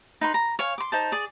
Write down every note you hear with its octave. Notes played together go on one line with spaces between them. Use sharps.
D#4 B4 C6
A#5
C#5 F5 G#5
C6 D6
D#4 C5 A5
G#4 D5